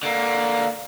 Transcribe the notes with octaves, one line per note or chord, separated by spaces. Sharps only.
D3 A#3